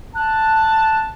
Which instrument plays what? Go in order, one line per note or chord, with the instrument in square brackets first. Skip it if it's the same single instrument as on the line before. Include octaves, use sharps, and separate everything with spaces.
[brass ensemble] A5 [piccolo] F#6